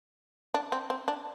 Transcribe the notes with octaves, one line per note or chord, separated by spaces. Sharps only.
D4
C4
C4
D4